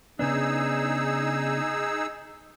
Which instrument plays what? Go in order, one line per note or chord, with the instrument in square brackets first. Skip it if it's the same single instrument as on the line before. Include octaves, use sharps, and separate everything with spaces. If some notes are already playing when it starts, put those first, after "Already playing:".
[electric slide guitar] C#3 B3 D4 [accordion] D#4 G#4 E6